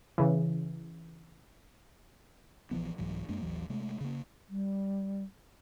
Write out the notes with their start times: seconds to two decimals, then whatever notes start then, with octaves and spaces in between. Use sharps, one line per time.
0.18 C#3 E3
2.71 A#1 E3 F3 B3
2.98 C2 G#2 E3 F#3
3.29 F#2 G#3 A#3 D4
3.42 A1 D#2 E3 F#3
3.69 C3 G#3 A3
4.01 C#3 A#3
4.49 G3